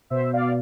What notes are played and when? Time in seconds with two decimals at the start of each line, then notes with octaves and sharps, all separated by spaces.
0.10 B2 C5 E5
0.33 D5 F5